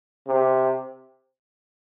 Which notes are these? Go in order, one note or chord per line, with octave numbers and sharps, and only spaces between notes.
C3